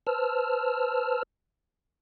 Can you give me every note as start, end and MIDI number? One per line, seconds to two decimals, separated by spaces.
0.07 1.23 71
0.07 1.23 72
0.07 1.23 81
0.07 1.23 88
0.07 1.23 89